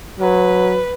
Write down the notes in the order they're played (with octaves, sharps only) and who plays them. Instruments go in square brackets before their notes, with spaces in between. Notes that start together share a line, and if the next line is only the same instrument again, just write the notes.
[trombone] F#3 [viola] B4